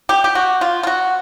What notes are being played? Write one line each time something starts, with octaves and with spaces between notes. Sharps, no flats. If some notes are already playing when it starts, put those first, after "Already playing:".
G4
G4
F#4
F4
F4
F#4